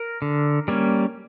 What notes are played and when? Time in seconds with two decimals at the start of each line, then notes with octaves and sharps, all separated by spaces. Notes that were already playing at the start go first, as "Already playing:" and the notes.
Already playing: A#4
0.22 D3
0.68 G3 A#3 C#4